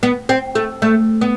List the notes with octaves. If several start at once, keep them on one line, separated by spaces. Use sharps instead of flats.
B3
C4
A3
A3
B3